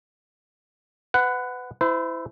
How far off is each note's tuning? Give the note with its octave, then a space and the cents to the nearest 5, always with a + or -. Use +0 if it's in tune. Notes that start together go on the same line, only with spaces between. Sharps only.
B4 +25 F#5 +0
E4 +0 C5 -35